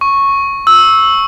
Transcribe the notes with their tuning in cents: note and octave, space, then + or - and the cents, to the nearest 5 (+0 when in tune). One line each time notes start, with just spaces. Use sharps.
C#6 -5
E6 -10